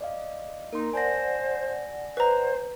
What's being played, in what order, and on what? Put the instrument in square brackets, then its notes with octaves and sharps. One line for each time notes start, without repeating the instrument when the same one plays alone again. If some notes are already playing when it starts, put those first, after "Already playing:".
[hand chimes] D5 D#5 F5
[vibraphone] A#3 [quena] D#4 [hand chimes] A#4 C6
[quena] C5 [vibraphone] D5 F#5 [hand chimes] G#5 A5 A#6
[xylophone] B4 A#5 [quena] C5